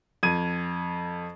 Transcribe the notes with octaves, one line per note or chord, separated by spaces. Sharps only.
F2 G#6 D#7